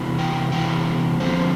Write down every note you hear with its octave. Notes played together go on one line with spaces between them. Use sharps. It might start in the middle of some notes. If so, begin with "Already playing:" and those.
Already playing: C3 E3 B3 E4
G5
C3 E3 B3 E4 G5
E2 D3 F3 C4 C5